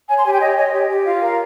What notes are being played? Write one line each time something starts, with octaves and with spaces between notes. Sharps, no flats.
C#5 G#5
C6
G4 G#5
G5
C#5 D#5
C#5 D#5
G4 C#5
G4
F4 F5
A#4